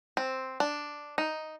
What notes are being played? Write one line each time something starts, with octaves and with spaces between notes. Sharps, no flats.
C4
D4
D#4